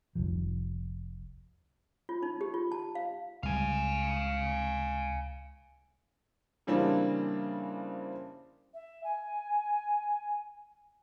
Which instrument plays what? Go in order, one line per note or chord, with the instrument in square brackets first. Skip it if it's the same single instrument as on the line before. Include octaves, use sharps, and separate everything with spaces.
[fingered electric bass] F1 C2 F3
[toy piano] F4
D#4
G4
F4
A5
F5
[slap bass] C#2 G3 [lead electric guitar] F5 G#5
[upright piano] C#3 E3 G3 A#3 C4 D4
[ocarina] E5
G#5